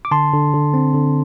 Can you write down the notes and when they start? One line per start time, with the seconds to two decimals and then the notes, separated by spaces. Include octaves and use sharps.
0.05 D6
0.11 D3 A5 C6
0.33 D3
0.54 D3
0.74 C4
0.94 D3